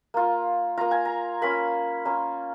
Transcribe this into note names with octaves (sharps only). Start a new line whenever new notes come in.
A#3 F4
A#3 F4 A#5
G#5
A#5
A#3 C#4 F4 B5
A#3 C#4 F4